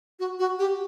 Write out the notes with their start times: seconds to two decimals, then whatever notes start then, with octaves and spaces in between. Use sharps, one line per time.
0.20 F#4
0.39 F#4
0.59 G4